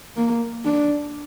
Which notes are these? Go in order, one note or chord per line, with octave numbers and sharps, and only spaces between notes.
A#3
D4